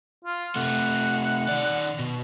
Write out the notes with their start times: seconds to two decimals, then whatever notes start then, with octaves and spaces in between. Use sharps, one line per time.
0.25 F4
0.56 C3 A3 F#5
1.48 D#3 D5
1.99 B2